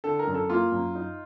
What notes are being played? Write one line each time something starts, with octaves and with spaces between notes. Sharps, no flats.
D3 A4
A#4
F#2
A4
A#3 F4
F#2
D#4